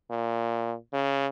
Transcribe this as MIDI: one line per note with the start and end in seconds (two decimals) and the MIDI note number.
0.10 0.75 46
0.93 1.27 49